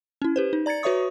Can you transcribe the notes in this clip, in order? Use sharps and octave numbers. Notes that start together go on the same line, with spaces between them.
C#4 E4
G4 B4 C5
D#4
D5 A#5 G#6 A6 C#7
F#4 B4 C#5 E5 C#6 D#6